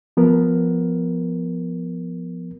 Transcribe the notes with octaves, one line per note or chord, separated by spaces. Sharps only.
F3 B3 A#4